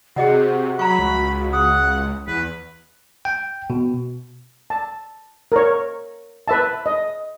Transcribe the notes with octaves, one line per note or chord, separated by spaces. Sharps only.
C3 F#4 G#4 D#5 F#5
F#3 A#5 B5 C#6
C#2
F#5 D#6
E2 B4
G5
B2
A5
A#4 C#5
B4 E5 A5
D#5